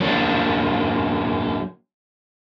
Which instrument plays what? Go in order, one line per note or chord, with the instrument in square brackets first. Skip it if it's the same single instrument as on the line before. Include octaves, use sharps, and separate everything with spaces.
[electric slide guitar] F#3 A#3 D4